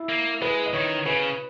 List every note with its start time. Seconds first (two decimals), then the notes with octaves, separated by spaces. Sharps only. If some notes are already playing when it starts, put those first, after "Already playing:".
Already playing: E4
0.09 A#3
0.42 G#3 B4
0.66 D#5
0.74 D#3 C#5
1.06 C#3 B4